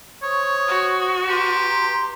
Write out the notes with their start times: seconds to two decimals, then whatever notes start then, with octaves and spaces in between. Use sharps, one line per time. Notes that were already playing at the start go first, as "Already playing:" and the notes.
0.23 C5 C#5 C#6 D#6
0.68 F#4
1.28 G4 B4 A#5 C6